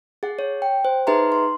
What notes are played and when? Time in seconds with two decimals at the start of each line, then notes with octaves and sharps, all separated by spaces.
0.23 G#4 F#5
0.39 C#5
0.62 G5
0.85 C5
1.07 D#4 G#4 B4 E5 A#5 C6
1.32 C6